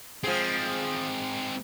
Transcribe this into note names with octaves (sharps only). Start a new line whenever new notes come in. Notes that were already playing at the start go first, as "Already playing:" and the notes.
F3 G#3 C4 G#4